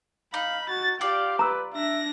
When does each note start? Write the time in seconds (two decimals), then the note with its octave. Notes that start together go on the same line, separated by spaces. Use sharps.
0.34 D#4 F5 B5
0.69 F#4 A6
1.01 F4 G4 D5 F5
1.39 B4 A#5 E6
1.74 D4 E5 A#6